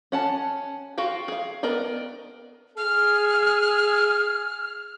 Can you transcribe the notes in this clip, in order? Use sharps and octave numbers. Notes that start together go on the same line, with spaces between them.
C#4 F#5 A5
F4 F#4 F5 G5
G#4 F5
B3 A#4 D5 D#5 G5
G#4 F6